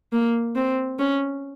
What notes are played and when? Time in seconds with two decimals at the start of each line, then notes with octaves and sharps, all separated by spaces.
0.13 A#3
0.56 C4
0.99 C#4